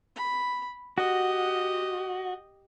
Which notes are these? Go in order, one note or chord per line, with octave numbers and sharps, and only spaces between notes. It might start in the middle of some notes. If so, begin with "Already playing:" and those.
B5
F#4 G4 D#5